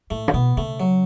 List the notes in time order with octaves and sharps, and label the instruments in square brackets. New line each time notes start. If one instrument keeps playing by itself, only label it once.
[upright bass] A2 [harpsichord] A3
[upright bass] C#3
[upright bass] B2 [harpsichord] B3
[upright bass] C#3 [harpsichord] A3
[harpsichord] F#3